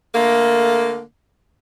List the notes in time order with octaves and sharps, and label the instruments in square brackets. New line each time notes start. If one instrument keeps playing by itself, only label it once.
[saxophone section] D3 A3 A#3